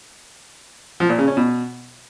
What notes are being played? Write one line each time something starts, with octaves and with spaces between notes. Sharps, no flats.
F3
A#2
C#3
C#4
B2